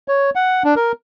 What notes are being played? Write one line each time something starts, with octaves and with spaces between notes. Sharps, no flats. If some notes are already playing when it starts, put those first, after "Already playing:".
C#5
F#5
D4
A#4